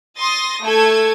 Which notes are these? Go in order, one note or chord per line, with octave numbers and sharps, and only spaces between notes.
C6 D#6 A6 A#6
A3 A4 G#6